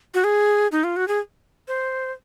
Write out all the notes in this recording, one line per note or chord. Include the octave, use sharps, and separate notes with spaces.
F#4
G#4
D#4
F4
F#4
G#4
C5